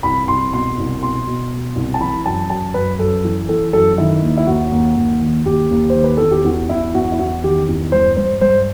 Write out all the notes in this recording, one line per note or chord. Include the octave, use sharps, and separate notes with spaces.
C2 B5
C2 C6
B2 C6
C2
B2 C6
B2
B2
C2
A5
E3 B5
F#2 A5
F#2 A5
F#2 B4
F#2 A4
E3
E3 A4
F#2 A4
D#3 E4
D#2
E4
D#2 F#4
D#2
D#2
D#3
D#2 G4
D#2
C5
D#3
B4
E2 A4
G4
E2 F#4
E2 E4
E2 F#4
E4
E2 F#4
D#3 G4
E2
G2 C5
G2 C5
G2 C5